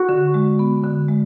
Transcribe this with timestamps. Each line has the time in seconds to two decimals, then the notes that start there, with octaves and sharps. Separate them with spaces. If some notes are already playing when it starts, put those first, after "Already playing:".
Already playing: F#4
0.09 D3
0.34 G#3
0.59 B3
0.84 D3
1.08 G#3